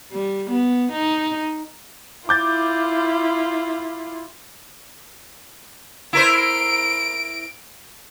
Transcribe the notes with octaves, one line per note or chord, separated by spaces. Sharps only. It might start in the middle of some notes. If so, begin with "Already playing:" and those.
G3
B3
D#4
E4 F4 D6 G6 A6
E4 A#4 C5 D7